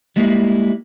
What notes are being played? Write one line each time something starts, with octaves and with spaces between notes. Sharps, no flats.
G3 G#3 A#3 E4